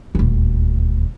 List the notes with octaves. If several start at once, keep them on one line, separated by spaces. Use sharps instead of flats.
D#1 D2